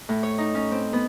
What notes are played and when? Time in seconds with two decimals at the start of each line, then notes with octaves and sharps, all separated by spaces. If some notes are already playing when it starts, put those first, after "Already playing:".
0.09 A2
0.23 C#5
0.38 D#4
0.55 C#4
0.71 C4
0.93 B3